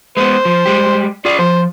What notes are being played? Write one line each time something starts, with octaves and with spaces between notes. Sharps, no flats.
G#3 A3 B3 C5
F3
G3 G#3 G4
F4 G#4 D5
F3 C5